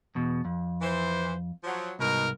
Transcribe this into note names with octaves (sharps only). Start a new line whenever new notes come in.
E2 B2
F2
E3 C5
F3 F#3
C2 G#2 B2 D#4 A#4